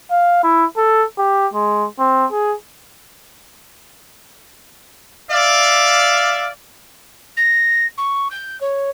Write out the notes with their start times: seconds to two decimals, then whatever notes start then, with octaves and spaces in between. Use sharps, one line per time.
0.11 F5
0.43 E4
0.77 A4
1.18 G4
1.53 G#3
1.99 C4
2.31 G#4
5.29 D5 E5 F5
7.37 A#6
7.97 C#6
8.31 G6
8.60 C#5